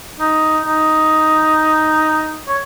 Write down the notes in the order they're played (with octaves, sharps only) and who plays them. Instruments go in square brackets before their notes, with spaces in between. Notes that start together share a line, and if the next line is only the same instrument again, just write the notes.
[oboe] D#4
D#4
C#5